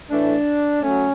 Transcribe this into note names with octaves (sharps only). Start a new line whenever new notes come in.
A2 E3 A3 D4
F#3 A3 C#4